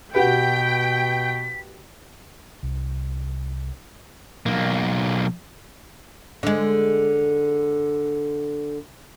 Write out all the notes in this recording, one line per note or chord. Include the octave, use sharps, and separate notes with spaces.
B2 F#4 G4 B4 G5 B6
C2
B1 A#3
D3 G#3